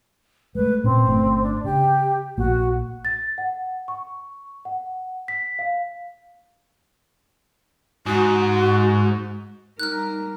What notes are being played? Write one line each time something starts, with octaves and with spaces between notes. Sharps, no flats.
G#3 A3 B4
A#2 C4 C#4
G1 A3 C#4
D4
C#3 G4
A#1 A#3 F#4
A6
F#5
C#6
F#5
B6
F5
G#2 F#4
G3 D#4 A#4 F6 F#6